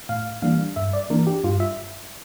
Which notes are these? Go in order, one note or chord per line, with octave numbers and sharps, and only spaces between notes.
A2 F5
E3 G3 A#3 D4 F5
G2 E5
D5
E3 A#3 D4 A#4
G4
G2 F4
E5